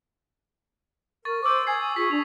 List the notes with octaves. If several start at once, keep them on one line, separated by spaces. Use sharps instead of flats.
A#4 C#6 A6
C5 C#6 D6 E6
G#5 D#6 G#6 C7
F4 G#4 C#6 B6
D4 C#6 F7